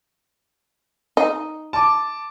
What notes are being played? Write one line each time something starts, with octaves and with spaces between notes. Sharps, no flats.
D#4
A5 D6